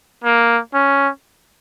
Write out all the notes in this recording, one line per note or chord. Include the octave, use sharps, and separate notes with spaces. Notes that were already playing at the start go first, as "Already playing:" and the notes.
A#3
C#4